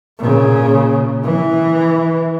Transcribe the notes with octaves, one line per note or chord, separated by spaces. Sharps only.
A#2 C#3
E3